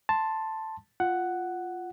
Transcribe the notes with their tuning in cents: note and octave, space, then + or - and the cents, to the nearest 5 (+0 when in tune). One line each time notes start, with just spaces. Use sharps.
A5 +0 C6 +0
F4 +0 F#5 +5